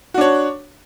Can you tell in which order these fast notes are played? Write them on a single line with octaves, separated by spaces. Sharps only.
F#4 D4 C#5